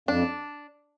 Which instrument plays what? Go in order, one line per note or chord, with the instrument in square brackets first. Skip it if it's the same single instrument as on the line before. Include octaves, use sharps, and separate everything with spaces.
[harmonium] F2 [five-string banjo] D4